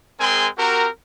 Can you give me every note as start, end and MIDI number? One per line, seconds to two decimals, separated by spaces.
0.20 0.48 56
0.20 0.48 60
0.20 0.48 68
0.20 0.48 70
0.20 0.48 80
0.20 0.48 84
0.58 0.88 60
0.58 0.88 66
0.58 0.88 67
0.58 0.88 70